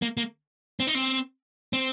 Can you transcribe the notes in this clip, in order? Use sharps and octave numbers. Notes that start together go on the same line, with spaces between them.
A#3
A#3
C4
D#4
C4
C4